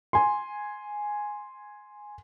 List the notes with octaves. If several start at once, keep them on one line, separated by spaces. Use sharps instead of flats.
G#5 C6